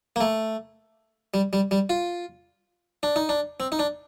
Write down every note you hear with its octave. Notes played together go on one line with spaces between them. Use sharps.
A#3
A3
G3
G3
G3
F4
D4
D#4
D4
C4
D#4
D4